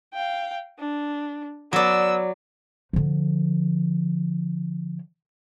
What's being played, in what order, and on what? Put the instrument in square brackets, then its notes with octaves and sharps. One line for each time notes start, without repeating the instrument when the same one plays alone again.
[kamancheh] F5 G5
D4
[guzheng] F#3 D5 [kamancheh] B3 E6
[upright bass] D3 F3